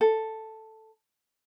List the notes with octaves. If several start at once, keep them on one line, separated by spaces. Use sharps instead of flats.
A4